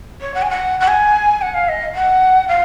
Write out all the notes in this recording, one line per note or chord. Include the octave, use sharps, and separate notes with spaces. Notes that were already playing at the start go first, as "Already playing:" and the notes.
C#5
F#5
G#5
F#5
F#5
G#5
F#5
F5
D#5
F#5
F5